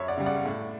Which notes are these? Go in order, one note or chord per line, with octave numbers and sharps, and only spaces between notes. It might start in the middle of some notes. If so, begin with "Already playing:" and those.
Already playing: F#2 C#5 E5
D5 F#5
C#3 G3
D5 F#5
A2